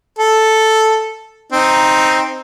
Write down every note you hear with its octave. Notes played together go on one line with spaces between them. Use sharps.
A4
C4 D#4